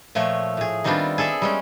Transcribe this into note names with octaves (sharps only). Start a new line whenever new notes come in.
A#2 F3 A3 C#5
A2 G#4
D#3 G3 B3 C4 D4 F4
G#4 A4 D5 E5
G3 G#3 C#4